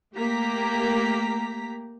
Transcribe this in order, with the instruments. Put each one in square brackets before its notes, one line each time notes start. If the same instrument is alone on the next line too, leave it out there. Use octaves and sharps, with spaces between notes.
[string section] A3 A#3 G4 A#5 B6